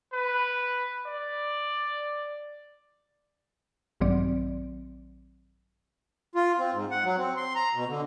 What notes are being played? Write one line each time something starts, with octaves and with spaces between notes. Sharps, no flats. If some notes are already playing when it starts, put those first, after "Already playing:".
B4
D5
A#1 G2 D#3 F#3 C4 D5
F4
C4
G#2
F#5
F#3
C4
C6
A#5
B2
D3